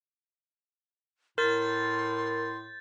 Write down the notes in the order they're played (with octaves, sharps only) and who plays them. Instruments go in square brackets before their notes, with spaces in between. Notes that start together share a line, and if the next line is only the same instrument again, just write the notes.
[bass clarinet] A2 [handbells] A#4 [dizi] C6 [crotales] G6 A6